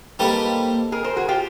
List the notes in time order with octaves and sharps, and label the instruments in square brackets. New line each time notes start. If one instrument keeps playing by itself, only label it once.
[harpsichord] G3 A#3 D#4 G4 C5 [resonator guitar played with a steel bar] A4 B4
[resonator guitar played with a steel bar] G#4 A#4
A#4 C5
F#4 G#4
F4 G4